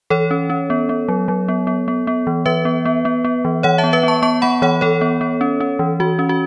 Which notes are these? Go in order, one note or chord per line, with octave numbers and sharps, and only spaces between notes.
E3 A4 C#5
C#4
C#4
B3
B3
F#3
F#3
B3
B3
B3
B3
E3
E3 B4 E5
B3
B3
B3
B3
E3
E3 C#5 F#5
E5 A5
B3
B4 E5
B3 A5 C#6
B3 A5 C#6
B3 F#5 B5
E3 C#5 F#5
E3 A4 C#5
B3
B3
C#4
C#4
E3
E3 F#4
C#4
F#4